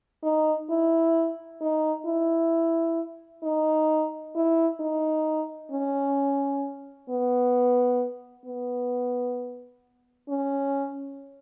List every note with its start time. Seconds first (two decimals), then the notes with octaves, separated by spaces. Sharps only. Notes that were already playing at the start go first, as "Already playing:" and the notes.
0.23 D#4
0.70 E4
1.61 D#4
2.06 E4
3.43 D#4
4.36 E4
4.80 D#4
5.71 C#4
7.09 B3
8.46 B3
10.29 C#4